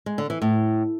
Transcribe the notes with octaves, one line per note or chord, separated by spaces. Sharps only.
G#3
D3
E3
A2